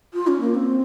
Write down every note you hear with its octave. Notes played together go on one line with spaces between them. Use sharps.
F4
C#4
A#3
C4